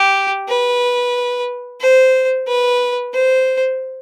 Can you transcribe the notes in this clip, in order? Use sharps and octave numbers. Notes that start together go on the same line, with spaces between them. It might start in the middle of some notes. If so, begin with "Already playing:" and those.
Already playing: G4
B4
C5
B4
C5